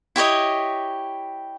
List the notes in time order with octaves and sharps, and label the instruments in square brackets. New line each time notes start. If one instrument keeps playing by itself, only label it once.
[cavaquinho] E4 G4 C#5 D#5